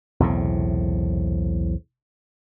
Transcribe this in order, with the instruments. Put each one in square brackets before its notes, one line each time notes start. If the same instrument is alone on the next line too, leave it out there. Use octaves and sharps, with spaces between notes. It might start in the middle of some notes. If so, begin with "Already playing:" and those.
[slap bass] B1 E2 A2 C3